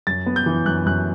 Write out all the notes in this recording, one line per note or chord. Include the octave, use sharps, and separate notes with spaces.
F#2 A6
B3
G6
E3
F#2 F#6
F#2 F#6